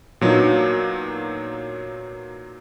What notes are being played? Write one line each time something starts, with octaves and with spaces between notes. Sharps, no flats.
A#2 F#3 B3 D4 D#4